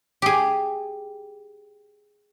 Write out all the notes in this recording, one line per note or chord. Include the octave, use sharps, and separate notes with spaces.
G4 G#4